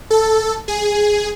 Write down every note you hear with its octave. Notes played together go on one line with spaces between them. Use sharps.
A4
G#4